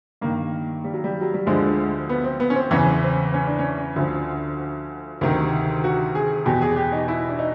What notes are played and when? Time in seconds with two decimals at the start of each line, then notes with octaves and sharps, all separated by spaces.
0.21 G2 D#3 A#3
0.84 G3
0.94 F#3
1.04 G3
1.21 F#3
1.34 G3
1.46 D2 D3 F3 G#3
2.09 B3
2.24 C4
2.40 B3
2.50 C#4
2.56 C4
2.71 E2 C#3 E3 C#4
3.03 C4
3.34 C#4
3.47 D4
3.59 C#4
3.96 D2 D3 F3
5.21 D2 C3 D#3
5.84 F#4
6.15 G#4
6.46 E2 B2 G4
6.62 G#4
6.76 G4
6.92 D#4
7.08 E4
7.28 D4
7.39 D#4